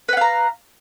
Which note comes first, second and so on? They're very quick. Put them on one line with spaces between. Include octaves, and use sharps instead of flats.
B4 F#5 F5 A#5